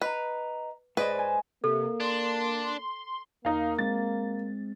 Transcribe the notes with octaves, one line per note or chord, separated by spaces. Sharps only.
B4 D#5 A#5
G#2 G#4 B4 C5 D5 D#5
D#5 G#5
C3 A#3 A4
D4 C6
E2 A#3 D#4 F5
G#3 C4 A6